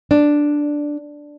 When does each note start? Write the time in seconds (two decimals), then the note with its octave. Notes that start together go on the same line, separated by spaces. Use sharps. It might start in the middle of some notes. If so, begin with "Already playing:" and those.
0.11 D4